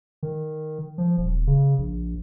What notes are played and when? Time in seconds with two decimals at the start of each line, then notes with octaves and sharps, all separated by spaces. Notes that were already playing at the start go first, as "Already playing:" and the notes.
0.23 D#3
0.98 F3
1.18 D#1
1.47 C#3
1.78 A#1